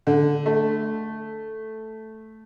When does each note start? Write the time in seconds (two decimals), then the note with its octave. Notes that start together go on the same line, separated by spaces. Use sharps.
0.07 D3
0.46 A3